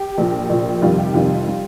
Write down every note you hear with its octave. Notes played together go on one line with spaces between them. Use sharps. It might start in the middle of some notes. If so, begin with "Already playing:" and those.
Already playing: G4
A#1 A#2 F3
A#1 A#2 F3
F2 C3 D#3 G3 F4
G4
F2 C3 D#3 G3 F4
G3